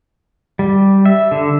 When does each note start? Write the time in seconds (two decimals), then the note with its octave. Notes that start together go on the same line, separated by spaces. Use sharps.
0.59 G3
1.06 E5
1.31 D3